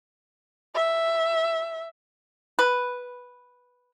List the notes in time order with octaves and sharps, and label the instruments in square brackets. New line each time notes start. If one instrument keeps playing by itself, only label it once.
[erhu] E5
[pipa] B4